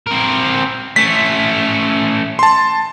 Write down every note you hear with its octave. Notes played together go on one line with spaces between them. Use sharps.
C4 A#4
A3 C#4 B6
A5 C6